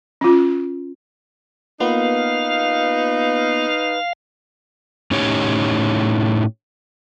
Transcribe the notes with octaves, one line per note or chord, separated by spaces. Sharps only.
C#4 F4
A#3 B3 D#4 F4 B4 F5
A2 C#4 D#4 G4 C#5